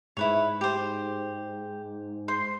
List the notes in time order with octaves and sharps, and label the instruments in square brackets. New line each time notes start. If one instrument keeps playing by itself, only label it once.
[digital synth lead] G#2 [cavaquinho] E4 B4 C#5
[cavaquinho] G4 C5
C5 C6